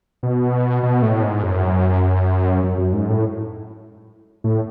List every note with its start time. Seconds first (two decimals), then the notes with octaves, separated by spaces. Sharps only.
0.23 B2
0.83 B2
1.02 A2
1.23 G#2
1.43 F#2
2.64 F#2
2.78 F#2
2.93 G#2
3.09 A2
4.44 A2